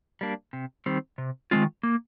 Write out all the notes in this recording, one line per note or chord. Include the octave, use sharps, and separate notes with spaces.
G3 A#3 D4
C3
D#3 G3 C4
C3
D#3 G#3 C4 F4
A#3